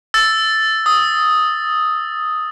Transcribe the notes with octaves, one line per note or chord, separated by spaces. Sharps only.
E6 A6
D#6